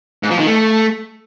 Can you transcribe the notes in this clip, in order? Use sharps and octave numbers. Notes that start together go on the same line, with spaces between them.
G#2
F3
D#3
A3